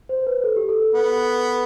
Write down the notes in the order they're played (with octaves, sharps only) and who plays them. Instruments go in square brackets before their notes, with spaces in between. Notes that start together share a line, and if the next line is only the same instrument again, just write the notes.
[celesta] C5
B4
A4
G4
A4
A4
[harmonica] B3